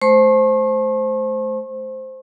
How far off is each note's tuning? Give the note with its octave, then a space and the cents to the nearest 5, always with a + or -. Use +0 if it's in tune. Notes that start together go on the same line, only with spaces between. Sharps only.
A3 -25 C5 +0 C#6 -45